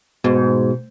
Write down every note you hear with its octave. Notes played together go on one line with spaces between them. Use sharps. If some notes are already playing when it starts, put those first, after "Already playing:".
G#2 B2